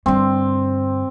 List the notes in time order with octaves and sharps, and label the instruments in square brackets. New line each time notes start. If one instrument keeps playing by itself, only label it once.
[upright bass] G2 D3 [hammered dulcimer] C4